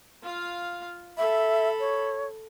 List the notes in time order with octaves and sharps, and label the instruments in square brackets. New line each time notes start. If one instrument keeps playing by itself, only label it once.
[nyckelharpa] F4 F5
[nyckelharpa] A4 B5 [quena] E5
[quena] C#5